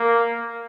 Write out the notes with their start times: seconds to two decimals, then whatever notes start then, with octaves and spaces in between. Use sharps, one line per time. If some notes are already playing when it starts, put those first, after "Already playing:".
Already playing: A#3